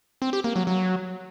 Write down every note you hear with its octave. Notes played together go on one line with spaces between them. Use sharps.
C4
G4
A#3
F#3
F#3